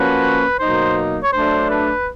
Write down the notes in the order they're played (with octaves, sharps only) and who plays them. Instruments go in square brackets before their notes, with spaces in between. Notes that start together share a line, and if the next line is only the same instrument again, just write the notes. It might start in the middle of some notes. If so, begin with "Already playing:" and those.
Already playing: [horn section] F3 A#3 C#4 F#4 [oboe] B4
[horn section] B2 F#3 A#3 D#4 [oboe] C5
[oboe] C#5
[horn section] F#3 A3 D4 [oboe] C5
[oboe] B4